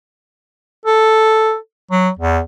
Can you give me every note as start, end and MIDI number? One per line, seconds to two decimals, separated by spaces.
0.86 1.56 69
1.91 2.09 54
2.19 2.40 40